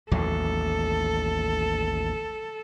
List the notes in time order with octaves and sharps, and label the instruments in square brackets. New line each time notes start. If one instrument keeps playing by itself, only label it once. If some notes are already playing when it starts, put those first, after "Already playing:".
[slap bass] A1 D#2 F#3 [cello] A4